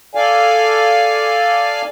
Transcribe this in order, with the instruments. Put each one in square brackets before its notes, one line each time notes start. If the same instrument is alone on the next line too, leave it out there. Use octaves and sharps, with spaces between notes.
[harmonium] A4 D5 F5 G#5